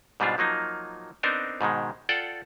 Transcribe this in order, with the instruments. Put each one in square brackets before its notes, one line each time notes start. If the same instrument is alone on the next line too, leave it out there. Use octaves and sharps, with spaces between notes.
[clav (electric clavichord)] G#2 B2 G3 B3 D4 F4
F3 F#3 A#3 D#4
B3 C4 D4 D#4 A#4 C5
G#2 B2 D#3 G#3
F4 A4 D5 F#5 G5